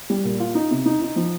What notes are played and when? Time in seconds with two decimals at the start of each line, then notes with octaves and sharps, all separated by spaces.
0.10 G3
0.24 A#2
0.40 F4
0.55 D#4
0.71 C3
0.86 D#4
1.02 D#4
1.16 F3